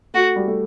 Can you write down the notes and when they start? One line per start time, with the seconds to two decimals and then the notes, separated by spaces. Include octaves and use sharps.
0.14 A3 F#4
0.36 G3
0.48 A3